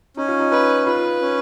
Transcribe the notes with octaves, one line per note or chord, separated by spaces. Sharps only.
C#4 D#4
F4
D#4
D#4 B4
F4 B4
C#4